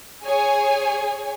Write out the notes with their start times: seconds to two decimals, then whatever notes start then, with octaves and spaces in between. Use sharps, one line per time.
0.24 G#4 C#5 G#5